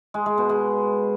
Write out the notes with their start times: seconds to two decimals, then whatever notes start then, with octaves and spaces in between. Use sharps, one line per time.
0.14 G#3
0.26 G#3
0.38 B2
0.49 G#3